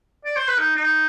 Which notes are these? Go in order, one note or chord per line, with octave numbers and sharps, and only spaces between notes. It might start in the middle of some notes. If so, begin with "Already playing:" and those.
D5
C5
B4
D#4
D#4